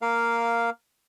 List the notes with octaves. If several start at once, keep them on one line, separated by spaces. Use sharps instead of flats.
A#3 A#4 F5